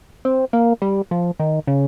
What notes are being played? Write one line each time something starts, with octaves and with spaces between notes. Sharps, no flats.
C4
A#3
G3
F3
D#3
C#3